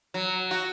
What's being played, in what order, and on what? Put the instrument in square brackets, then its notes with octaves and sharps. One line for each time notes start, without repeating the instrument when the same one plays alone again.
[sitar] F#3
F#4